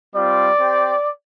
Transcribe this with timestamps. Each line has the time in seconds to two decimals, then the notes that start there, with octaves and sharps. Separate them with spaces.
0.15 G3 C4 F4 D5
0.59 C4 G4